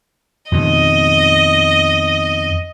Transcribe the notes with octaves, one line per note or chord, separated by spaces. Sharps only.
F2 B2 D#3 D#5